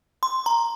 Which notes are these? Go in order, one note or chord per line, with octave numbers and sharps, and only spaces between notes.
C6
A#5